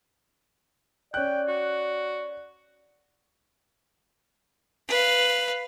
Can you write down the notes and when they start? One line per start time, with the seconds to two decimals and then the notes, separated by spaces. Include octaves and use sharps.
1.14 C#4 D5 G5 F#6
1.48 F#4
4.88 B4 F5